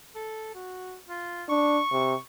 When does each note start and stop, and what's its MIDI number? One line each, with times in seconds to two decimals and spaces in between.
0.15 0.52 69
0.55 0.96 66
1.08 1.44 65
1.49 1.79 62
1.49 2.19 85
1.92 2.15 48